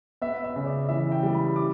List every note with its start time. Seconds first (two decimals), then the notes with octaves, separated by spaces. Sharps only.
0.21 B3 E5
0.44 E5
0.56 C#3
0.66 D5
0.89 E3 E5
1.12 G5
1.23 G3
1.34 B5
1.56 E4 D6